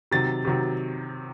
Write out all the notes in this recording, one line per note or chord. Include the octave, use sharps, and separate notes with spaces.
C3 D#3 F#3 A6
C3 D#3 F#3